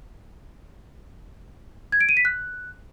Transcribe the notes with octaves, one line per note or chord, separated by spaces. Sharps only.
G#6
D7
D#7
B6
F#6